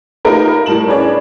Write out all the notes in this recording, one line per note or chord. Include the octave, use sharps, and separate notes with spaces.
A3 D#4 F4 G4 A#4 B4
A2 G3 A5 E7 F#7
C#4 D4 G#4 B4 C#5 D5